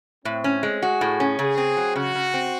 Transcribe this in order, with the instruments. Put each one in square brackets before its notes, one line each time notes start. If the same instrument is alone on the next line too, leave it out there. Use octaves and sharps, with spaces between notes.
[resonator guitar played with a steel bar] A2 [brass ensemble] C4
[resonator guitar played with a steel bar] C#4
G#3
[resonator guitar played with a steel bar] F#4 [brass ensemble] G#4
[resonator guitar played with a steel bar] A2
C#4
[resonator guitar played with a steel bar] C#3 [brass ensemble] G#4
[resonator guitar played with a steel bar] C4
F#3
[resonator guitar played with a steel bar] C#3 [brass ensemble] F#4
[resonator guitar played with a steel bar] C#3
C4